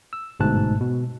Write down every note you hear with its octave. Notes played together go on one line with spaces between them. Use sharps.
E6
G1 G#2 B2 A3 A5 F#6
B2